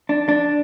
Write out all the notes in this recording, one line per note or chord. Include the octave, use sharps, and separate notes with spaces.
D4
D4